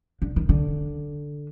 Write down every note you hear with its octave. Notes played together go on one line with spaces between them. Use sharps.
D3
D#3
D3